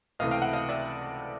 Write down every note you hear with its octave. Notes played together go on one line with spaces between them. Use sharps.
C#2 C3 E3 A3 D#5 F5
F5 G5
E5 F#5
D#5 F5
D5 E5